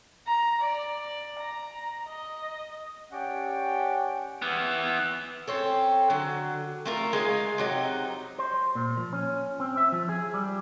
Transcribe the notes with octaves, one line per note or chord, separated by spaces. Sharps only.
A#5
D5
A#5
D#5
C#4 G4 C#5 D5 F#5 G5
E3 B3
C4 C#4 A4
D3 F#3
A3 F4 A#4
G#3 D#4 F4 G#5
C3 F#3 D#4
C5
A#2
F3
C#4
C4
E5
F3
G#4
G3